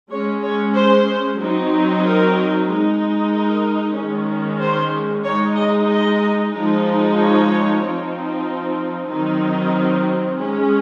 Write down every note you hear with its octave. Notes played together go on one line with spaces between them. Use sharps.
G#3 C#4 C#5
C#5
C5
F#3 C4 D#4
A#4
G#3 D#4
A#4
D#3 G#3 C#4
C5
G#3 D#4 C#5
D#5
D#5
F3 G#3 D#4
C#5
F3 C4 D#4
D#3 F#3 C4 D#4
G#3 C#4